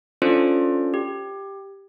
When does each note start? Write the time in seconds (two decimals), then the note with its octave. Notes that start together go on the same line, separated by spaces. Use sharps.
0.22 C#4 D4 F4 A4 C5 D5
0.94 G4